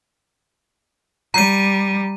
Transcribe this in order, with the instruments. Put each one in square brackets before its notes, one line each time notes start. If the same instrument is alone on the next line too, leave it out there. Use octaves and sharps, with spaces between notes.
[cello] G3 [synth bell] A#5 D#7